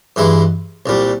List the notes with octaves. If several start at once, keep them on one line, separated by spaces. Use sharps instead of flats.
G2 E3 G#3 E4
C2 A#2 G3